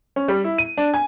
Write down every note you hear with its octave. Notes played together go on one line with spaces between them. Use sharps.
C#4
G3
E4
D#7
D4
G#5